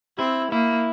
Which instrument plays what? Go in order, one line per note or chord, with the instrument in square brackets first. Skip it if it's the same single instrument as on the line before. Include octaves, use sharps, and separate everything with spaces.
[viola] C4 [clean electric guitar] E4
[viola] A#3 [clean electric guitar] E4